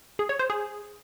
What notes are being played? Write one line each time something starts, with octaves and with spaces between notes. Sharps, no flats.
G#4
C#5
C5
G#4